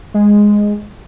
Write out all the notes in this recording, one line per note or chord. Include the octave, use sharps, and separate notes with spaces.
G#3